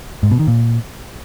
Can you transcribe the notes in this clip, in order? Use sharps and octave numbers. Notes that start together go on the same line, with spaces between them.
G#2
B2
D#3
A#2